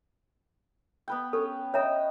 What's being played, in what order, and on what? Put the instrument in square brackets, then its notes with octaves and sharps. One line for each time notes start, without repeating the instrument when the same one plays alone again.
[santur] B3 B4 G5
[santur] C#4 [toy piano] A4
[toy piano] C#5 E5 A#5 [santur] D#5 G5